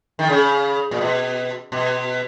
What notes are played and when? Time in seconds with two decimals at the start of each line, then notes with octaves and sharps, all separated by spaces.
0.19 D#3
0.29 C#3
0.91 A#2
1.01 B2
1.72 B2